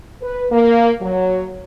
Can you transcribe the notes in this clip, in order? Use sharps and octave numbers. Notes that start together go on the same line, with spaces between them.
B4
A#3
F#3